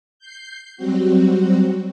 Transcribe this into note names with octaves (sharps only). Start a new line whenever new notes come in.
G6 C7
F#3 G3 C4 F#4